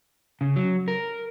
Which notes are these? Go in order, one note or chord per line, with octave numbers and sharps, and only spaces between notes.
C#3
F#3
A#4